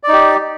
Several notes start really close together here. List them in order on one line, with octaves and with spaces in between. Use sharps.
D5 D#4 G4